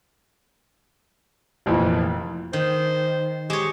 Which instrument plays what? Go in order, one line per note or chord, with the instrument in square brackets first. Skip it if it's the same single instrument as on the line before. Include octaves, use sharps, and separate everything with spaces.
[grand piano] F1 F2 A#2 E3
[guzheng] D#3 [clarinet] C5
[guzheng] G#3 C#5 [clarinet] G4